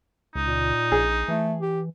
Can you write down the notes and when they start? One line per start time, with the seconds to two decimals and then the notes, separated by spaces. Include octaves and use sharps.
0.35 C#2 D#4
0.47 A#2
0.92 A#1 G#4
1.28 E3 A3
1.61 G4